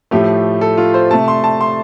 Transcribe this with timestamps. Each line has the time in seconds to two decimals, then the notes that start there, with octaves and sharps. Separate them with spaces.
0.11 A2 F3 A3 G4
0.61 A4
0.78 F4
0.94 C5
1.11 C3 A3 A5
1.28 C6
1.44 A5
1.61 C6